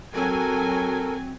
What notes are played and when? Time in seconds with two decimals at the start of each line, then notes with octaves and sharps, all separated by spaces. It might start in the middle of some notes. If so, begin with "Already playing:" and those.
0.15 F#3 C4 A4 A#4 G#5